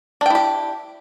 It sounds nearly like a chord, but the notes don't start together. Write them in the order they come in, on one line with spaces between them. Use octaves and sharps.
D4 G5 E4 G4